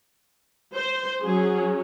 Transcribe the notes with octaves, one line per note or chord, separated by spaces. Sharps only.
C5
F#3 C#4 G#4